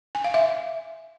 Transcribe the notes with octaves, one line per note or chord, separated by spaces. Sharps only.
G#5
F5
E5